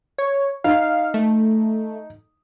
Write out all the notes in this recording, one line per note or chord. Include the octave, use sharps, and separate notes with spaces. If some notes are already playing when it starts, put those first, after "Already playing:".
C#5
D#4 F5
A3